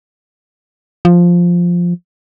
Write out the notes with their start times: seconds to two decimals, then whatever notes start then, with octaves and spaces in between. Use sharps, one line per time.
1.05 F3